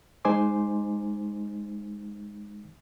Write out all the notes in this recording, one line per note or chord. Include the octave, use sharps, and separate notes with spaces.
G#3 D#4 C5 G#5 C6 D6